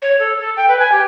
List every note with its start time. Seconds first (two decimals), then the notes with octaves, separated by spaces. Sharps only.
0.02 C#5
0.19 A4
0.39 A4
0.57 G5
0.68 B4
0.79 G#5
0.92 G4